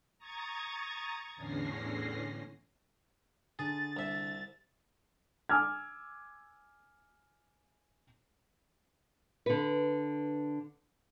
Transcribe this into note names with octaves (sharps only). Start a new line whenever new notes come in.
A#5 C#6 D#6 G#6 A6
E2 A2 D3 C#4 A#6 C7
D3 G#4 A6
C2 E5
G#5 D6 E6 F6 G#6
D3 B4